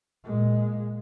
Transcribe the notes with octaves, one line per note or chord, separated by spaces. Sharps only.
A#2 G#3